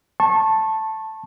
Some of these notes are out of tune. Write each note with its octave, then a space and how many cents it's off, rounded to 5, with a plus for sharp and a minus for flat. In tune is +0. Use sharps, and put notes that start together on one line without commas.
A5 +0 C#6 -30